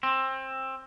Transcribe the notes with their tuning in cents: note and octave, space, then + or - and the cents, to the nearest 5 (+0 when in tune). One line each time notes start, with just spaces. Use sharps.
C4 +20